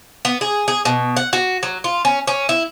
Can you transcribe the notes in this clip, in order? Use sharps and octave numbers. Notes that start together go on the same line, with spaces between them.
B3
G#4
G#4
B2
F#5
F#4
F#3
F4
C#4
C#4
E4